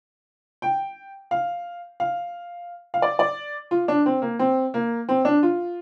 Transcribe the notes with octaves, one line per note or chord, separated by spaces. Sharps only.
G5
F5
F5
F5
D5
D5
F4
D4
C4
A#3
C4
A#3
C4
D4
F4